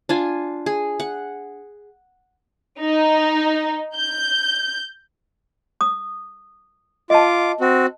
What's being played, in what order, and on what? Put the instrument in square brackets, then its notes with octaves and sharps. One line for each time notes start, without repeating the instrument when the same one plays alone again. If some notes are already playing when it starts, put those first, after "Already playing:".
[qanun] D4 F4 G#5
G#4
F#5
[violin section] D#4
G6
[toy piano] D#6
[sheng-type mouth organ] F4 D6 [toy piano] D#5 A5
[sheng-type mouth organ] C4 F#4